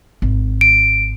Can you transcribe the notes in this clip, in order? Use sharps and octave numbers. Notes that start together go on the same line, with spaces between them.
G#1
D7